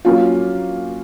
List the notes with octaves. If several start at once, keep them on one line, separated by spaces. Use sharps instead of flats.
F#3 A#3 C#4 F4